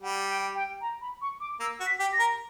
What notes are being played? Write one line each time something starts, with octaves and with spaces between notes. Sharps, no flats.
G3 F#5
G5
G5
A#5
B5
C#6
D6
A#3 E6
F#4
B6
G4
A#6
A#4